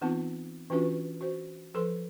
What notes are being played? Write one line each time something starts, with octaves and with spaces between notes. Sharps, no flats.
E3 B3 C4 D#4 F4 A5
E3 C#4 D4 F4 F#4 B4
F#4 C5
F3 A4 B4 C6